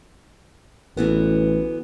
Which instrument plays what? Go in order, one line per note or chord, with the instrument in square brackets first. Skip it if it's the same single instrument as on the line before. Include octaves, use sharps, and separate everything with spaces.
[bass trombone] A1 [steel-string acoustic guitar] D2 E3 B3